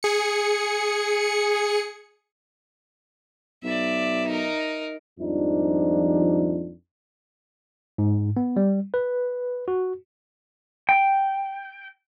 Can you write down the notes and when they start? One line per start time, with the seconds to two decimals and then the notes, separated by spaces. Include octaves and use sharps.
0.03 G#4 C#7
3.63 B1 D5 E5
4.27 D#4 A#4
5.20 G#1 F2 F3 G3 D4 D#4
7.98 G#2
8.37 B3
8.56 G3
8.94 B4
9.68 F#4
10.89 G5